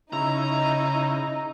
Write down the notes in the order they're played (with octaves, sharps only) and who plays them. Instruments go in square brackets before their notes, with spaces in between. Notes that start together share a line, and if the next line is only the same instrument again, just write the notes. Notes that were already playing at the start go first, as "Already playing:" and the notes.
[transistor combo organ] C#3 E4 [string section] D#4 [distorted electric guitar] A#5